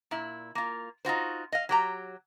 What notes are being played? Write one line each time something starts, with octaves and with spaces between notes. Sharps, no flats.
A#2 E4
A#3 F4
D#4 F4 F#4 C5
D#5 F5
F#3 G4 A#5